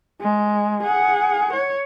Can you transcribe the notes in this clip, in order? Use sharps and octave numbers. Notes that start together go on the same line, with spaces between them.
G#3
G#4 F#5
C#5